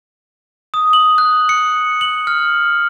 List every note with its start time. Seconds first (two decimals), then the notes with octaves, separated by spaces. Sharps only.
0.74 D#6
0.93 F#7
1.18 F#6
1.49 C#7
2.01 F#7
2.27 F6